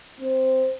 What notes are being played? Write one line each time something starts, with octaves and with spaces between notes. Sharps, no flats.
C4